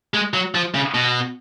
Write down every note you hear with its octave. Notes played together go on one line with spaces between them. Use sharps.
G#3
F#3
F3
C#3
B2